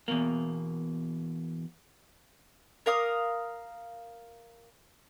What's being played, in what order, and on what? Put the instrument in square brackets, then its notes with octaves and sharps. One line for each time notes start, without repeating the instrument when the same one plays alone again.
[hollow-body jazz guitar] E2 B2 A#3
[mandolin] A#4 F5 D#6